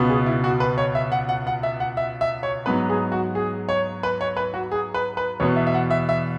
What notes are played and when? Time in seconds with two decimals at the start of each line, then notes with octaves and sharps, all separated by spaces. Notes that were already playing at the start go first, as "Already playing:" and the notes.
Already playing: C#2 B2 B3
0.09 G#4
0.26 E4
0.44 F#4
0.60 B4
0.78 C#5
0.95 E5
1.12 F#5
1.29 F#5
1.47 F#5
1.63 E5
1.80 F#5
1.97 E5
2.21 E5
2.43 C#5
2.66 G#2 F#3 B3 B4
2.90 G#4
3.12 F#4
3.35 G#4
3.69 C#5
4.03 B4
4.21 C#5
4.37 B4
4.54 F#4
4.72 G#4
4.94 B4
5.17 B4
5.40 E2 B2 B3 C#5
5.56 E5
5.67 E5
5.74 F#5
5.91 E5
6.09 E5